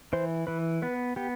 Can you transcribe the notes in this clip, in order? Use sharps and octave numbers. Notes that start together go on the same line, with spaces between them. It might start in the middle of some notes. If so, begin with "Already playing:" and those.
E3 C5
E3 B4
B3 B4
B3 G4